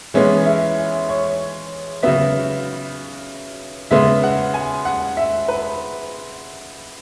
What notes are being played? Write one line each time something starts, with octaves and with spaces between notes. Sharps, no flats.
E3 G#3 B3 C#4
E4
C#5
C#3 F#3 B3 E5
C#3 G#3 B3 E5
F#5
G#5
F#5
E5
B4